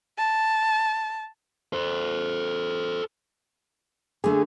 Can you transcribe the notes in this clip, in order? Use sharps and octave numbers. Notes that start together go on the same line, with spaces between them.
A5
A4 C5
D3 A3 G#4